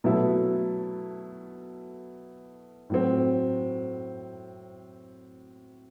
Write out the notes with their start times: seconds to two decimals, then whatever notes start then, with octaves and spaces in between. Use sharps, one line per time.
0.04 B2 F#3 A3 E4 A4
2.90 A2 F#3 C4